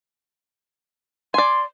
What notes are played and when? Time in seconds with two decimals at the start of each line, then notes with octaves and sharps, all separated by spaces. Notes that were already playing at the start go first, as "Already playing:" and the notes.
1.34 D5 G#5 C6